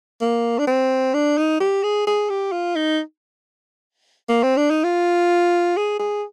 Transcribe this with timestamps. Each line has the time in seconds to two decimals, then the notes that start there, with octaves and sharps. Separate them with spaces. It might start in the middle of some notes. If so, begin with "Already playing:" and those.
0.21 A#3
0.59 D4
0.67 C4
1.14 D4
1.38 D#4
1.60 G4
1.84 G#4
2.07 G#4
2.29 G4
2.52 F4
2.76 D#4
4.29 A#3
4.43 C4
4.57 D4
4.71 D#4
4.84 F4
5.77 G#4
5.99 G#4